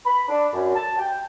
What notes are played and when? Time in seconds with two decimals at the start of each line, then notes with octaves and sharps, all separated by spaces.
0.05 B5
0.28 D4
0.53 F#2
0.75 A5
0.98 G5